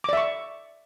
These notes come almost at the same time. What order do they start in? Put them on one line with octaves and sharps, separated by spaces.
D6 D5 E5 C#6